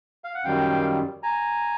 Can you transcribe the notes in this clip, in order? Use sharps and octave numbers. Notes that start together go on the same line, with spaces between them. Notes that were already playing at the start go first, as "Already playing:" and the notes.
F5
F#5
F#2 D#3 G3 F5 G5
G#5 A#5